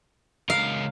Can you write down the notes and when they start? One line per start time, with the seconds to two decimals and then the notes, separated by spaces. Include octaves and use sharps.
0.50 C#2 A#4 F5